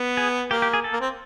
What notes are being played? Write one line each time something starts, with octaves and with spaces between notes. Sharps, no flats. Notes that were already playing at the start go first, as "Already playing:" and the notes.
Already playing: B3
G#4
A#3 G4
G4
G#4
A4
A#3
C4